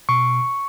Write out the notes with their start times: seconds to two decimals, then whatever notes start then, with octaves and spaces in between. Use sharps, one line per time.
0.09 B2 C#6